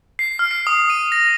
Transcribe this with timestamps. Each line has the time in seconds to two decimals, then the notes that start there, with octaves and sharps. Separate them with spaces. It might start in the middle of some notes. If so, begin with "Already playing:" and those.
0.19 C7
0.39 F6
0.51 C7
0.67 D#6
0.90 D#7
1.12 A#6